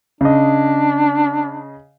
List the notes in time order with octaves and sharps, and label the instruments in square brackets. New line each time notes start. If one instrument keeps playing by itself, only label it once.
[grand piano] C#3 D#5 [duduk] D4